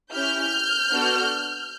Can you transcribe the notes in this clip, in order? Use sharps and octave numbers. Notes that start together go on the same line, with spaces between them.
C#4 E4 G4 F6 G6
B3 D4 F#4 A4